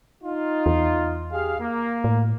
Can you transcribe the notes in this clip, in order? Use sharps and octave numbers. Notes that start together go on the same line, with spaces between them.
D#4 F4
E2
G4 G#4 F5
A#3
A2